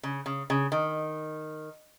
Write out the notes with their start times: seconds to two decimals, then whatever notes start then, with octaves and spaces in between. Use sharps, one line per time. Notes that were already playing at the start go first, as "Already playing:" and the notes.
0.03 C#3
0.26 C#3
0.50 C#3
0.72 D#3